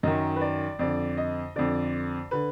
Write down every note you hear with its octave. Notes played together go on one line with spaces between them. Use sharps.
F#2 D#3 D#5
B4
D5
F2 D3 D5
D#5
F2 D3 D5
D3 B4